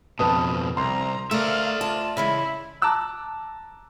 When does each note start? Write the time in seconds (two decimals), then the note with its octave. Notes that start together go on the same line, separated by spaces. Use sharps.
0.19 F2 B2 B4 A5 D#6
0.77 C2 A#5 C6
1.31 A3 A#4 D5 E5 F5
1.81 F4 A5
2.17 C#3 E3 G#3 E4
2.82 A5 A#5 D6 E6 F#6